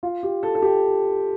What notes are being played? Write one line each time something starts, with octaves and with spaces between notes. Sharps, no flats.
F4
G4
A4
A4
G4